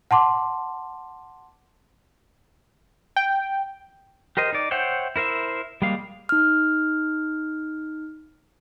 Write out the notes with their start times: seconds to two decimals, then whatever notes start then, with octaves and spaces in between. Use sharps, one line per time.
0.11 F#5 A5 C6 D6
3.16 G5
4.37 G4 A#4 C5 D#5
4.53 D#4 D5
4.71 C5 C#5 E5 F#5 G5
5.16 E4 A#4 C5 E5
5.82 G3 G#3 A#3 F5
6.29 D#4 F6